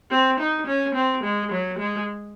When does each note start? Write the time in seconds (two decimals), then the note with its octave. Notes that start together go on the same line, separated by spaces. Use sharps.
0.11 C4
0.40 D#4
0.67 C#4
0.95 C4
1.23 G#3
1.52 F#3
1.79 G#3